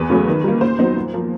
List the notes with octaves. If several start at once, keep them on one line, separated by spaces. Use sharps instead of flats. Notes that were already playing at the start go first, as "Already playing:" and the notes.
Already playing: E2 B4
C#3 F#3 A3 C#4
D#3
G3 A#3
A#2 C5
F#3 B3 D#4
A#2
F3 A#3